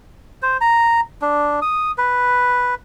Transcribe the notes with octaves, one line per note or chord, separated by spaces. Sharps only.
C5
A#5
D4
D#6
B4